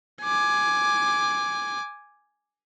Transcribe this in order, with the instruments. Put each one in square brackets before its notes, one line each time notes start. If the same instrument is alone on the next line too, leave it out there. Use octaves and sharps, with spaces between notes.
[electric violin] G#5 D6